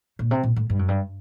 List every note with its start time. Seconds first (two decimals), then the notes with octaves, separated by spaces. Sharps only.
0.19 A#2
0.31 C3
0.43 A#2
0.56 A2
0.70 G2
0.79 F#2
0.88 G2